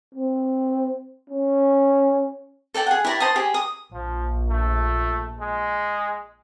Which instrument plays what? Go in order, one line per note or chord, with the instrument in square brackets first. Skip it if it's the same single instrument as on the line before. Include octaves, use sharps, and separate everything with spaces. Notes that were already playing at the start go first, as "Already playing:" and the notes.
[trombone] C4
C#4
[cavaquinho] A4 D5 G5 A5
G#4 F#5
E4 G4 D5 A#5
C5 A5 D#6
G4 G#4
D#6
[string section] A#1 [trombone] F3
[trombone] A3
G#3